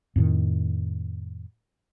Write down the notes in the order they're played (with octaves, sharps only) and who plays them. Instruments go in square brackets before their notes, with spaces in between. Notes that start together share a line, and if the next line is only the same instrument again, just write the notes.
[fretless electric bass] F2 A2 D#3